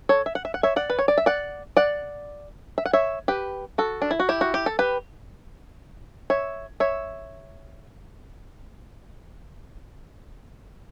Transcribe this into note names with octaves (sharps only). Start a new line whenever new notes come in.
A4 C#5
E5
F#5
E5
F#5
C#5 E5
D5 F#5
B4
C#5
D5
E5
D5 F#5
D5 F#5
E5
F#5
C#5 E5
G4 B4
F#4 A4
D4
E4
F#4
E4 G4
F#4
G4
A4
G4 B4
C#5 E5
C#5 E5